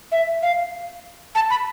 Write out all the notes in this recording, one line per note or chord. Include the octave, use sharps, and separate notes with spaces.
E5
F5
A5
B5